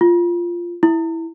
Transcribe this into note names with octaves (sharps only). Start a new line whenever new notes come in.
F4
E4